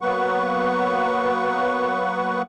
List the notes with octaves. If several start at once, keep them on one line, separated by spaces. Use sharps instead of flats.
F#3 A#3 B3 B4 F#5 C#6